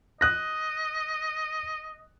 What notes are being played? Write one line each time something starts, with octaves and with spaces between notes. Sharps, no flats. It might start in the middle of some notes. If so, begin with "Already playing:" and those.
D#5 D#6 F#6 A#6